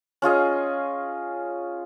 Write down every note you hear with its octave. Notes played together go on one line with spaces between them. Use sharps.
C#4 F4 G#4 D#5